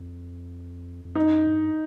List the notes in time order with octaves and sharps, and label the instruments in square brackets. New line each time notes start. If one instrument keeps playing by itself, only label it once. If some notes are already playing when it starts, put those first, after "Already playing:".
Already playing: [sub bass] F2
F2
[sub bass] F#2 [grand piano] D#4
[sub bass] G2